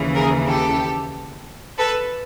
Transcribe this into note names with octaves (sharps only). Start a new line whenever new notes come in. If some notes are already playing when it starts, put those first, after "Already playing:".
Already playing: D#2 C#3 E3
G#4 A#4
G4 A4
A4 B4